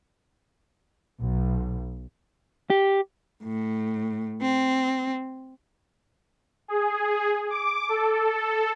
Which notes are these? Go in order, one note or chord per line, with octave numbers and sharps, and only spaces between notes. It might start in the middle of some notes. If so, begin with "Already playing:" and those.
B1
G4
A2
C4
G#4
D6
A4